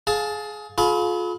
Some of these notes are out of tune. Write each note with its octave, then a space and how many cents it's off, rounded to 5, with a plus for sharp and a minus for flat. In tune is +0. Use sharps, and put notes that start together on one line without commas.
G#4 +20 F5 +20 A5 +0
F4 +25 G#4 +45 B5 +0